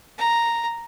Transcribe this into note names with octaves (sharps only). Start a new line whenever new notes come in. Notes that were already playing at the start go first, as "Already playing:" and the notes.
A#5